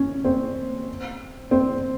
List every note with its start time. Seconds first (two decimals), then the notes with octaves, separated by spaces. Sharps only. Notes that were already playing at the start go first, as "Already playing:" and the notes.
Already playing: C#4
0.25 C4
1.51 C4